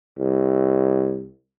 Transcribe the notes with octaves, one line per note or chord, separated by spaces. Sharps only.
C2